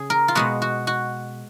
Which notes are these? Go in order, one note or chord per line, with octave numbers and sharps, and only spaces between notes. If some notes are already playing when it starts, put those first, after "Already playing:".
Already playing: C#3 G#4
A#4
F4
B2 G#3 B3 F#4
F#4
F#4